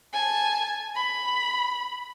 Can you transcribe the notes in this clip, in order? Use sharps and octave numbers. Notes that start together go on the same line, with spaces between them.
G#5 A5
B5